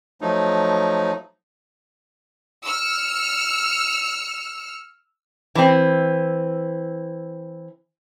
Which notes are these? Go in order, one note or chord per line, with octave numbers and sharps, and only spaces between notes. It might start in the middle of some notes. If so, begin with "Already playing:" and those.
F3 F#3 A3 D#4
E6 F6 C#7
E3 C4